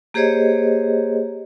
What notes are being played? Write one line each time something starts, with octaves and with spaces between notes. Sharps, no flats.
A#3 G4 G#4 C5 C#5 D#5